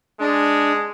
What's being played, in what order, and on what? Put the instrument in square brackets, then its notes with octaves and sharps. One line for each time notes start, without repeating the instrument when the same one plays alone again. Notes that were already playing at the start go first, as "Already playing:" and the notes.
[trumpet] G#3 [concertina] D4